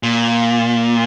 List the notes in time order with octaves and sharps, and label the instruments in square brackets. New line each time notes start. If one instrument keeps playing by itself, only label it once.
[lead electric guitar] A#2